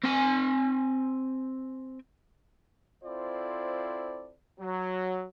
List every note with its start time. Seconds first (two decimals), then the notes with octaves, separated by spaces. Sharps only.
0.04 C4 G#5
3.04 C4 E4 F4 A4 C5 D5
4.60 F#3